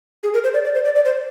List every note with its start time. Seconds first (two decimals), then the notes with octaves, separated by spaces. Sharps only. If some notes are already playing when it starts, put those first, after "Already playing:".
0.23 G#4
0.34 A#4
0.44 C5
0.54 D5
0.64 D5
0.75 C5
0.85 D5
0.95 D5
1.05 C5